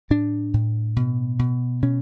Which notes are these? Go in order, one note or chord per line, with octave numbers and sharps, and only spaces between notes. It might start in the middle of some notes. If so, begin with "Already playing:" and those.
A2 D4
A2
B2
B2
B2 C#4